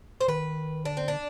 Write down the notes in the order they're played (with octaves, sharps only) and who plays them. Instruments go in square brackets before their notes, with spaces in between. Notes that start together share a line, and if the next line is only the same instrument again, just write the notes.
[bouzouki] C5
[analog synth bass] D#3 [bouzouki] B4
[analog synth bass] D3 [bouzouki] D4
[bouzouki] C4
D4